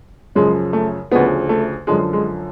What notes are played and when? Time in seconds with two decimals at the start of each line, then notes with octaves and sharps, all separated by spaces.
0.35 F#2 C#3 F3 G#3
0.73 A3
1.11 D2 C#3 F3 B3
1.49 A3
1.87 F#2 D3 F3 G#3
2.13 G#3